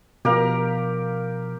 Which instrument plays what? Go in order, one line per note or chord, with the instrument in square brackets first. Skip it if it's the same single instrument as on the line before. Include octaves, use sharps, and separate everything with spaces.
[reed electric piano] B2 F3 [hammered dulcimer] G4 A#4 F5